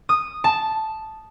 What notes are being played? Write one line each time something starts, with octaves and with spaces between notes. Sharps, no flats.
D#6
A5